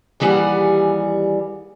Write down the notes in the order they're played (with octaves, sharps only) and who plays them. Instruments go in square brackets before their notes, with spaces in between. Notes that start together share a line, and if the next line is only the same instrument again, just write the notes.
[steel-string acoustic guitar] D#2 E3 G3 G#4 F#5